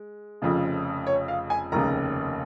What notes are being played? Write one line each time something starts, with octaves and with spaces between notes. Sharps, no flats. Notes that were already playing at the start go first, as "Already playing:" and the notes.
Already playing: G#3
F1 F2 C#3 F3
C#5
F5
G#5
F1 D#2 C#3 A#5